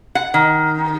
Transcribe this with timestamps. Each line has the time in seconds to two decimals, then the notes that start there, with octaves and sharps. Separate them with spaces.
0.15 F#5
0.34 D#3